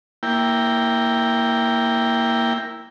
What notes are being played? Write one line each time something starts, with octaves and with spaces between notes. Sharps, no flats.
A#3 E4 G5